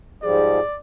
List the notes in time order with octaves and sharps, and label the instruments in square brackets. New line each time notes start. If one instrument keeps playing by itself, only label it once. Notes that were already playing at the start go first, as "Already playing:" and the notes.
[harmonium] G#2 F3 G3 [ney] G#4 [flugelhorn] D5